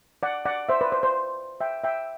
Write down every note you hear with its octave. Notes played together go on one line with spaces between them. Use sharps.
D5 F#5
D5 F#5
C5 E5
B4 D5
C5
C5
E5 G5
E5 G5